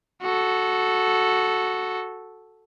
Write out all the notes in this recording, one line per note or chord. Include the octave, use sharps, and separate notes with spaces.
F#4 A4